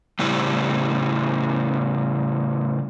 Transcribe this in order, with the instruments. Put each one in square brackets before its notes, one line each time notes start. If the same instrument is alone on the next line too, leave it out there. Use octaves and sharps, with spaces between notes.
[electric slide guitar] A2 C#3 G3 E4